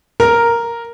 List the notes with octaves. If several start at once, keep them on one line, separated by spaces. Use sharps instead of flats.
A#4